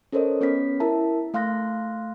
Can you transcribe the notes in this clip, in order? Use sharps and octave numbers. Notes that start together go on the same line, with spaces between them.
C#4 A4 A#4 C5 C#5 D#5
B3 C#4 B4 B6
E4 A#4 E5 A5 A#5
A3 F5 C6 F#6 A#6